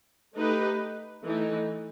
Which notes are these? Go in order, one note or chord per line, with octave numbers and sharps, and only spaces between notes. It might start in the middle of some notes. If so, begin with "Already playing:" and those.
A3 D#4 G4 B4
E3 A3 D#4